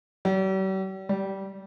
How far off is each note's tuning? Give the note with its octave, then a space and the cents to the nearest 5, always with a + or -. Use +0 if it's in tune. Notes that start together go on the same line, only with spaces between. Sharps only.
G3 -45
G3 -20